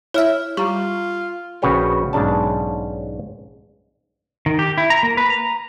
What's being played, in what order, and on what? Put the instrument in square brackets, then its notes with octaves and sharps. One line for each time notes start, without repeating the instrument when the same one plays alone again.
[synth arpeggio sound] E4 E5 [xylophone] C#5 F6
[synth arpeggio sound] G3 [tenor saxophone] F4 [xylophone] A#5 C#6
[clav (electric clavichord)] A#1 C#3 F#4 B4 C#5 G5
B1 G#2 C#3 D4 A5
[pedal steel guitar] D#3
G4
E4
A#5
A#3
B4
A#5